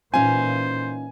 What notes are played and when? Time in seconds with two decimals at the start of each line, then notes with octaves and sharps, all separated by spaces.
0.14 A#2 E3 C#4 D#4 F4 C5 G#5